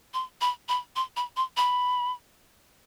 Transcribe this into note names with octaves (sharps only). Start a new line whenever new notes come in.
C6
B5
B5
C6
B5
C6
B5